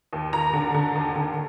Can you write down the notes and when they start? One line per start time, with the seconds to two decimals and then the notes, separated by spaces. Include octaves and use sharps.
0.13 D#2
0.33 D#2 A#5
0.53 D3
0.74 D3
0.95 D#2
1.16 D3